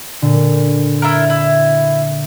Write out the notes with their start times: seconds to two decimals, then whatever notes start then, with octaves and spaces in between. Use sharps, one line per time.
0.22 A#2 D3
1.02 E4 F4 A#4
1.30 E4